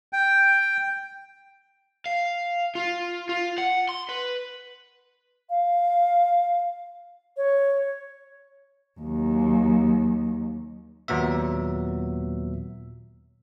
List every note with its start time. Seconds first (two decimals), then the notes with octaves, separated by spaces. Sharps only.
0.13 G5
2.06 F5
2.75 F4
3.29 F4
3.58 F#5
3.89 C6
4.09 B4
5.50 F5
7.37 C#5
9.01 D#2 F#3
11.08 D#2 A#2 F#3 B3 E5